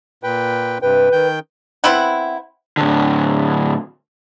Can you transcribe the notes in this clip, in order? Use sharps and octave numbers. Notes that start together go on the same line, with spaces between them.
A#2 B4 G5
G2 C3 B4 G5
D#3 G5 G6
B3 C4 E4 F#5
A2 D3